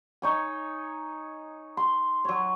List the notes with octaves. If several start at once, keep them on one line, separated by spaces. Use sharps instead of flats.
D#4 C#5 G#5
C6
F#3 C#5